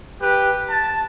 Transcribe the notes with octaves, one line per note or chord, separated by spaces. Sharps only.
G4 B4
A5